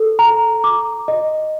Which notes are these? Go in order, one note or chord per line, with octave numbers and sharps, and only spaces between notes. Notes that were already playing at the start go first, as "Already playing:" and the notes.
Already playing: A4
A#5
D6
D#5